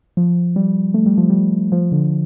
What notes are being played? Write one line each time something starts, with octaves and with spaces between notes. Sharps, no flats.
F3
G3
A3
G3
F3
G3
F3
D3